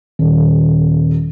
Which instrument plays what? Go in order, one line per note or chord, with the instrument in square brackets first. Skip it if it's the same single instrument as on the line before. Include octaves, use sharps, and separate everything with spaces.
[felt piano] D#1